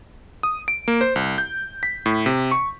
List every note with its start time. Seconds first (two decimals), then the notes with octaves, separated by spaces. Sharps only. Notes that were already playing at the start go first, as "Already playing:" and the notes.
0.43 D#6
0.68 D7
0.88 A#3
1.01 C5
1.16 C2
1.38 G6
1.83 B6
2.06 A2
2.26 C3
2.51 C#6